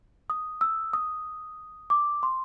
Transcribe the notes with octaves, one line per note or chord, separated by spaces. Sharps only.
D#6
E6
D#6
D6
C6